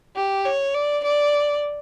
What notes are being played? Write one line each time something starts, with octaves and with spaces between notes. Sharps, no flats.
G4
C#5
D5
D5